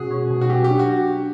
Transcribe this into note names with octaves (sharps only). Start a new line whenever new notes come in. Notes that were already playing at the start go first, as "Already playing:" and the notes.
Already playing: B2 G#3 C#4 F#4 G#4
C#4
B2
F#4
F#3 G4
G4
D4
F#4